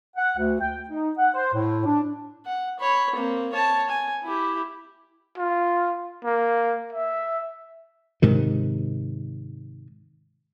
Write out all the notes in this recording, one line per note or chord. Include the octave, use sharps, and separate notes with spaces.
F#5
D2
G5
D#4
F#5
C5
A2
D4
F#5
C#5 B5
A#3 C4
C#5 A5
G#5
E4 G4
F4
A#3
E5
G#2 C3 D#3